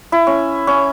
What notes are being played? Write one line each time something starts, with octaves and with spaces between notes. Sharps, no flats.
E4
C#4
C#4